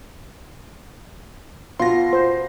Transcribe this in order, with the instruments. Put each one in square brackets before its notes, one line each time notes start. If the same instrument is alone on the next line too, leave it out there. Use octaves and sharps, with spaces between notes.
[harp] B2 [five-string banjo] F4 [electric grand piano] C6 A#6
[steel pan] C5